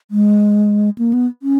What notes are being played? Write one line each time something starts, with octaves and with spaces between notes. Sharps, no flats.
G#3
A#3
B3
C#4